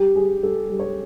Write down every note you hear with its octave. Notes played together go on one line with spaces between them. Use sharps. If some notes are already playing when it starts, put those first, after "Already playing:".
Already playing: G3 G4
G3 G#4
G3 A4
G3
C#5